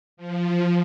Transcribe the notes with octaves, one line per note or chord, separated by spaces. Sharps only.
F3